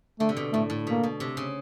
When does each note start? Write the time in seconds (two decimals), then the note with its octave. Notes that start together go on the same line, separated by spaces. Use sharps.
0.20 D3 A3
0.29 C3
0.37 B2
0.53 A2 A3
0.70 A2
0.87 B2 A#3
1.03 B2
1.20 C3
1.37 C#3